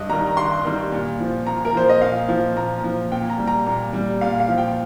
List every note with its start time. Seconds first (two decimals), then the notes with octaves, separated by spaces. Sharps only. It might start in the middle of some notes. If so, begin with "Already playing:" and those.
Already playing: G2 D#5
0.09 D#3 G3 A#5
0.37 G2 C6
0.64 D#3 G3
0.92 A#2
1.20 F3
1.47 A#2 A#5
1.65 A#4
1.74 F3 C5
1.89 D#5
2.02 A#2 F5
2.28 F3
2.56 A#2 A#5
2.84 F3
3.12 A#2 G5
3.30 A#5
3.38 G3
3.47 A#5
3.66 A#2 A#5
3.93 G3
4.21 A#2 F5
4.40 F5
4.48 F3
4.58 G5